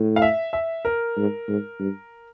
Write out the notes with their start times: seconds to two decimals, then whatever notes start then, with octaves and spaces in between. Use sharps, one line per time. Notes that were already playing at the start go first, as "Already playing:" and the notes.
Already playing: A2
0.16 F5
0.22 E5
0.53 E5
0.85 A#4
1.17 G#2
1.48 G#2
1.79 G2